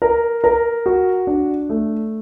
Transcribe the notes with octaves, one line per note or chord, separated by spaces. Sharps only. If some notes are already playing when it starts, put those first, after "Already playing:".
A#4
A#4
F#4
D4
A3